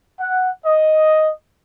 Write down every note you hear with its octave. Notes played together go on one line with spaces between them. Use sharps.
F#5
D#5